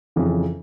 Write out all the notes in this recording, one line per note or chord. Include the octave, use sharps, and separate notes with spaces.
F2 C#3 E3